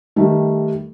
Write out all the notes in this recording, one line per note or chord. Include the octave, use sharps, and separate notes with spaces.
D#3 G3 A3